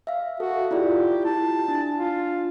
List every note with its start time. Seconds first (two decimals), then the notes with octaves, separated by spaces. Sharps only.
0.07 E5 F5
0.40 F#4 A4
0.71 E4 F4 G4 D5
1.25 E4 A5
1.68 D4
1.96 F4